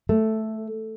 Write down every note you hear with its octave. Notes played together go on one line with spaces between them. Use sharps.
A3